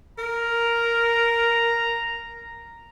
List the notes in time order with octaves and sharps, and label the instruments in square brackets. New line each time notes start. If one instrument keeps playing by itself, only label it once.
[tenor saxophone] A#4 [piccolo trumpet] A#5